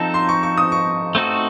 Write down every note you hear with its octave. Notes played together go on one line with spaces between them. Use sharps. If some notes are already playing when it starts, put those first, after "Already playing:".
Already playing: F3 C4 D#4 A4 A5
C6
C#6
C#6
D#6
C#6
A3 C4 D#4 F#4 A4